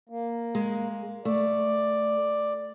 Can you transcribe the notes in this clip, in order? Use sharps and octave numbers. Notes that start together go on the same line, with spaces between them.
A#3
G#3
A3 D5